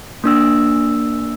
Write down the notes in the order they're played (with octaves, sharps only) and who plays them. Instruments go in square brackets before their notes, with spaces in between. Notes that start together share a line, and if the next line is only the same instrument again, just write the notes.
[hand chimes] A#3 D4 E6